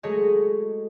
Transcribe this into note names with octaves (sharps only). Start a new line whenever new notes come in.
F#3 G#3 A3 G#4 C#5 D#5